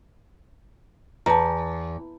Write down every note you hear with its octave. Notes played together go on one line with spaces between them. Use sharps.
E2 A5 A#5